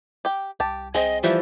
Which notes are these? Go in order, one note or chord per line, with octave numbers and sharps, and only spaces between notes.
G4 G5
C2 G4 A5
C2 C4 G#4 D#5
E3 F3 G3 E5